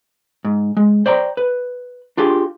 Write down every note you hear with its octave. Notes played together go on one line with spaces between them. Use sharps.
G#2
G#3
C5 D5 G5 A#5
B4
D4 F4 G4 G#4